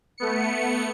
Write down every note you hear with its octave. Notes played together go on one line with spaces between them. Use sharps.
A3 B3 C#7